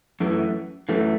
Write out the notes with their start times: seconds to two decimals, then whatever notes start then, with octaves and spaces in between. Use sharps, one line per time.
0.20 F#2 E3 A3
0.89 F#2 E3 A3